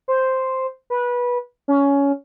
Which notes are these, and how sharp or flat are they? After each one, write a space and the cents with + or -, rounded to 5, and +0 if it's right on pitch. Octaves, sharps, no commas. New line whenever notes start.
C5 +0
B4 -20
C#4 +15